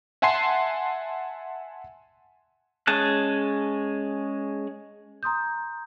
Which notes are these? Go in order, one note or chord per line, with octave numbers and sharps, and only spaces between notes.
E5 F#5 G#5 A5 C6 C7
G#3 C#4 G#4 A5 F#6
A#5 C6 D#6 G6